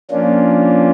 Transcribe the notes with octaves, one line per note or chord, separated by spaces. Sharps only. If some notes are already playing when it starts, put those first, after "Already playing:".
F3 A#3 C#4 D4 F4